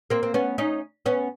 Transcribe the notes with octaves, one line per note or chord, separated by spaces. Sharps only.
A#3 C4
C4
B3 C#4
C#4 D#4
B3 C#4